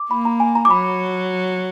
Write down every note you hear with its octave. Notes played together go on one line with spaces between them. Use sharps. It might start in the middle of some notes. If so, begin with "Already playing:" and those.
Already playing: D6
A#3 B5
A#5
G#5
A#5
D6
F#3 B5